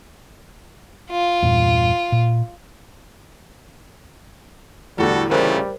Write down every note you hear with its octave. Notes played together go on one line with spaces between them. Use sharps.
F4
E2 G2 A#2
A#2
E2 A2 D3 G3 F#4 A4
A#2 C#3 G3 A3 A#4 C5